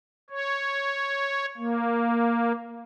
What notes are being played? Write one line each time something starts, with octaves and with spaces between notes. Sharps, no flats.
C#5
A#3